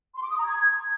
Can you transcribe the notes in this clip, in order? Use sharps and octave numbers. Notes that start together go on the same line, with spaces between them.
C6
D6
D#6
A#5
G#6